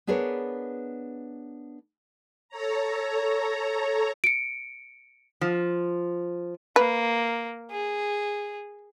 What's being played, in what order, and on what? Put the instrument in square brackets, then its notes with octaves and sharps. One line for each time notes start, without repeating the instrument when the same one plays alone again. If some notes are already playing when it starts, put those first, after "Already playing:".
[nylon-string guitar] B3 D4 G#4 A#4 B4 C#5
[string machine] A4 C#5 A#5
[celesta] C#7 D7
[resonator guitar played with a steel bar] F3
[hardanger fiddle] A#3 [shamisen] B4
[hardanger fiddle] G#4